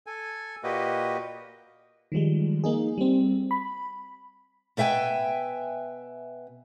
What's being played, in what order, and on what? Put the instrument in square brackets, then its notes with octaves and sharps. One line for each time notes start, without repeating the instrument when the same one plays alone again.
[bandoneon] A4 G#5
A#2 A#3 F#4 G4 B4 D#5
[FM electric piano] D#3 F3 G3 G#3
A#3 D#4 G#4
G3 C4
B5
[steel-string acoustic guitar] B2 B4 E5 G5 G#5